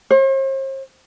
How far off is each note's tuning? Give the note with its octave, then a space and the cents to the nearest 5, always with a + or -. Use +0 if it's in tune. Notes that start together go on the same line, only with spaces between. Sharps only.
C5 +45